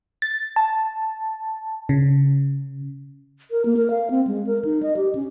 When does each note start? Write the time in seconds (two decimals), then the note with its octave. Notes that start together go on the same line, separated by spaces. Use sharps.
0.22 A6
0.56 A5
1.89 C#3
3.51 A#4
3.65 A#3
3.77 A#4
3.90 F5
4.10 C4
4.27 G#3
4.47 A#4
4.65 D#4
4.83 D#5
4.97 G4
5.15 C#4